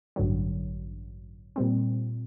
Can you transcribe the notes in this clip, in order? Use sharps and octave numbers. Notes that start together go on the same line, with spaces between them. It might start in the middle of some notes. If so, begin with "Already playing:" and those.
A1 G2 D3 F#3
A#2 G3 C4